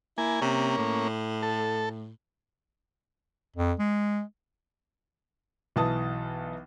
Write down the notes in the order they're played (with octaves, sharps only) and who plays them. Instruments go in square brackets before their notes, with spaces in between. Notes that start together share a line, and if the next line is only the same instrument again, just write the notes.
[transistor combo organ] A#3 G#5 [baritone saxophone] E4
[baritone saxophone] C3 [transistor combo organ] A#3 C#4
[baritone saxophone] A2
[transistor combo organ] A4
[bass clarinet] F2
G#3
[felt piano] B1 E3 A5 D#6